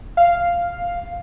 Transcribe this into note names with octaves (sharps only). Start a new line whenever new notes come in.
F5